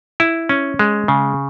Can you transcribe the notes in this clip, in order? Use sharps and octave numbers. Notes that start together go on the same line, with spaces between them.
E4
C#4
G#3
C#3